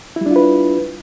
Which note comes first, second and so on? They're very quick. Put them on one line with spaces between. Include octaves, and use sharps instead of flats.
E4 G3 D4 F4 B4